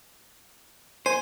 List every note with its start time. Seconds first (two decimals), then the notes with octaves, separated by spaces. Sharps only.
1.06 C5 G#5